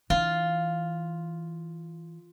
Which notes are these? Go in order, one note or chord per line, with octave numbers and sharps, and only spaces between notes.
E3 F4